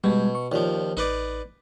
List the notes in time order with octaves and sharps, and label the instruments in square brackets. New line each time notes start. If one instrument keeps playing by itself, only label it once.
[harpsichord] B2 [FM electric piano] G3 G#3
[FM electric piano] C#6
[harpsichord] D#2 F3 [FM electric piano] F4 C#5 D5
[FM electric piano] A1 [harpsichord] D#4 B4 D5